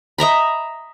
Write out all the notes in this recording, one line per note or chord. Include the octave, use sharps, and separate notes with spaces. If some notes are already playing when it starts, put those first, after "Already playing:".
D#5 E5 A#5 B5